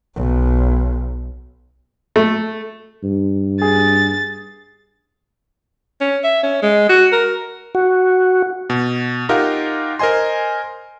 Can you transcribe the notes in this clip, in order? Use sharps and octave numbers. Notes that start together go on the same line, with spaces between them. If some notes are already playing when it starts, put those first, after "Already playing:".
B1
A3
G2
G#4 A6
C#4
E5
C#4
G#3
F#4
A#4
F#4
B2
D#4 F4 G4 A#4 F5 F#5
A#4 C5 D#5 G#5 C6